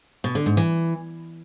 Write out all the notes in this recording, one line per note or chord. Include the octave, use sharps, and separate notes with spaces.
B2
D3
G#2
E3